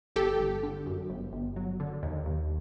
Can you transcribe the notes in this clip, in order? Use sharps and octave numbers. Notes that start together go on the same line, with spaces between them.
G1 G4 A4
G1
D3
F#2
G1
G1
F#3
D3
D#2
D#2